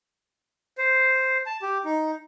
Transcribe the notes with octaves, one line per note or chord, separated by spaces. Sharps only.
C5
A5
G4
D#4